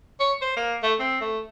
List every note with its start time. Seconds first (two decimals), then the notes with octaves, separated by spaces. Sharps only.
0.20 C#5
0.42 C5
0.56 A#3
0.83 A3
0.99 C4
1.21 A3